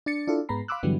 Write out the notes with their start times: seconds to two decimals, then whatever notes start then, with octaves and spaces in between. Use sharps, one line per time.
0.06 D4 A6 C#7
0.27 D4 E4 F4 A4
0.49 G#2 G#3 B3 A#5 B5 C7
0.68 F5 B5 C6 D6 E6 F#6
0.83 G2 D3 E3 F#3 G3 B3